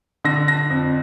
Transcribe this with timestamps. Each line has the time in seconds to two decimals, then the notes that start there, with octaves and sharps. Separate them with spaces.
0.24 D3 A#6
0.48 A#6
0.70 F2